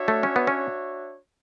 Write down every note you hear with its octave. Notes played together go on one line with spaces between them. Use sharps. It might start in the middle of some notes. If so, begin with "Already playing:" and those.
Already playing: D4 F#4 C#5 E5
A3
C#4
B3
C#4